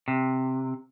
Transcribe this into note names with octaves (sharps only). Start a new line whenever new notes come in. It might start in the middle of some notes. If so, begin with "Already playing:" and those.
C3